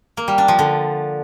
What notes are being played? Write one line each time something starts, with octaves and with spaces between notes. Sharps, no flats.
A#3
G3
D4
F3
D3